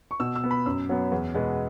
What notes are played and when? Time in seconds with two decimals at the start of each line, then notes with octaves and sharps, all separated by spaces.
0.11 C#6
0.20 B2 E6
0.36 E6
0.44 B3
0.51 B5
0.66 F#2 E6
0.89 F#3 B3
1.12 E2
1.35 B2 G#3 B3